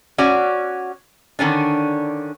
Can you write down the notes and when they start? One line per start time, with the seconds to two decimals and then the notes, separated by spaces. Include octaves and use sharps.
0.18 C#4 F#4 D5
1.39 D3 D#3 C#4 D4